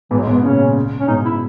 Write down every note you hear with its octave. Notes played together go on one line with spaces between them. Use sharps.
G#2 B2 E3
F#3
G#3
G#2 B2
B3
A#2 C#3 C#4
C#4
G#2 B2 D#4
E4